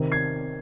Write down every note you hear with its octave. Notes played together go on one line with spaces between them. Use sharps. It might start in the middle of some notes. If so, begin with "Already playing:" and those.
Already playing: C3 D#3
G#6 C7